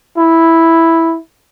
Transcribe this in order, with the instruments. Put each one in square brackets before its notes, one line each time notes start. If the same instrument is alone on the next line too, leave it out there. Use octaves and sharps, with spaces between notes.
[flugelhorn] E4